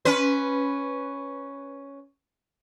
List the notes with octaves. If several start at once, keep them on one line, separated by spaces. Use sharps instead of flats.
C#4 B4